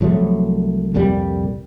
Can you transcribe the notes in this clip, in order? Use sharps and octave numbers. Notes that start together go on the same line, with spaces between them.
C2 F3 F#3 A3
C2 F2 A#2 G3